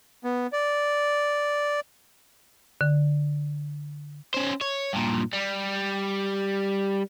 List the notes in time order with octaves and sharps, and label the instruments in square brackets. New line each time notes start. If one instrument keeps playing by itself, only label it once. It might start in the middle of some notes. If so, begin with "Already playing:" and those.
[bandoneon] B3
D5
[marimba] D3
[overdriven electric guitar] C#4 C5
C#5
G2 A#2
G3